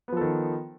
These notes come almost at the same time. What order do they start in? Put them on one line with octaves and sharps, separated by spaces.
B3 F3 A4 D#3